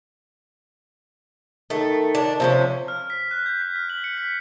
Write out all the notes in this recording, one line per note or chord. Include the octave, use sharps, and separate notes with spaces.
D#3 A3
D4
C3 F3 C4 C#4
F6
B6
F#6
G6
B6
F6
F#7
C#7
B6